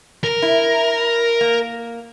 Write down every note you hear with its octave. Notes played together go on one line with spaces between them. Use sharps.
A#4
E4
A#3